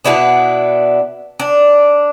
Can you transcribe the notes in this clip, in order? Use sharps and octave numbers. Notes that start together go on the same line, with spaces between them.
B2 B3 D4 E4
D4